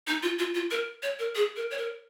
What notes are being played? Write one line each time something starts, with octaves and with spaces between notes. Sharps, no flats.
D#4
F4
F4
F4
A#4
C#5
A#4
G#4
A#4
C#5
A#4